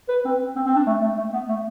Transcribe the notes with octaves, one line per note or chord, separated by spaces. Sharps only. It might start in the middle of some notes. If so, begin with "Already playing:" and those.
B4
C4
C4
C4
D4
A3
A3
A3
B3
A3